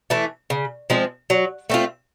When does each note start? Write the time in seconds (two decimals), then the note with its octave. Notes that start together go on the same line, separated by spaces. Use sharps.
0.10 E3 A3
0.50 C#3
0.90 F3 G#3 C4
1.30 F#3
1.70 A3 C4 F4